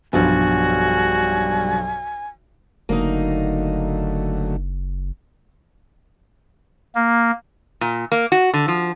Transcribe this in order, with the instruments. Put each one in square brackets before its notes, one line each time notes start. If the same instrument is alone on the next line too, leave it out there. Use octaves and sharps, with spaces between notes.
[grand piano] B1 G2 F3 [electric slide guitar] B2 G3 [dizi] F#4 [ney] G#5
[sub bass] F#1 [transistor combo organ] D3 F#3 A3 [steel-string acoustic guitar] A#3 D#4
[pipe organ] A#3
[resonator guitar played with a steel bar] A#2
A#3
F#4
D3
F3